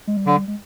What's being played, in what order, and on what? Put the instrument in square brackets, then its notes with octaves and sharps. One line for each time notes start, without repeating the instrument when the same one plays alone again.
[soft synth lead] G#3
G3
[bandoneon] D3 [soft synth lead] F#3
[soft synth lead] G3
G#3